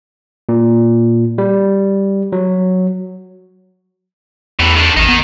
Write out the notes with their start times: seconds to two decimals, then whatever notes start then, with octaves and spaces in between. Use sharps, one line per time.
0.49 A#2
1.38 G3
2.32 F#3
4.59 E2 A2 E3
4.76 D#3 D4
4.96 A1 D#3 D#4
5.09 B3